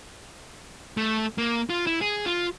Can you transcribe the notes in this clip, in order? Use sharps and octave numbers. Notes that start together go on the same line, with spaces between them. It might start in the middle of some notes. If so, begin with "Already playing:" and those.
A3
A#3
F4
E4
G#4
F4